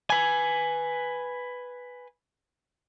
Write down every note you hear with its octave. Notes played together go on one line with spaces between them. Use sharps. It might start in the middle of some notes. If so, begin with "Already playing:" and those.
B4 G#5